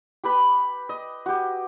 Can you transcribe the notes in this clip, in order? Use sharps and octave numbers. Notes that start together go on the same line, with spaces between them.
G4 B4 B5
D#5
F#4 G4